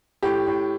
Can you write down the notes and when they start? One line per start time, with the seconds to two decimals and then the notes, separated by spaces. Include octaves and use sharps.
0.23 A2 G4
0.47 A2